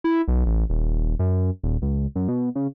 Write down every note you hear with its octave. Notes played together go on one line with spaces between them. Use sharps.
E4
B1
A1
D#1
F#2
D#1
C#2
F#2
B2
C#3